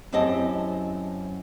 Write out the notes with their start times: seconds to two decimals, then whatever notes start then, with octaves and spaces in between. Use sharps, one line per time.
0.12 F#2 C4 E4 G4 D#5 A5